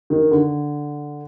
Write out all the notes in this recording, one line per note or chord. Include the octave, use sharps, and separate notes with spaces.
D#3
D3